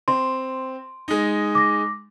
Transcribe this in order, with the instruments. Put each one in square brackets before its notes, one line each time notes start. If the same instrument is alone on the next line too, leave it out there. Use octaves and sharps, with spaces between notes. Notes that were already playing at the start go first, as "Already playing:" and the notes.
[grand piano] C4 [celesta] C6
[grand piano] G#3 D#4
[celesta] D6 A#6